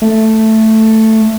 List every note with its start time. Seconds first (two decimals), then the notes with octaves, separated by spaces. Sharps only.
0.02 A3